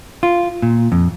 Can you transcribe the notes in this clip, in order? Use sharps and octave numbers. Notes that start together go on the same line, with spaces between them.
F4
A#2
F2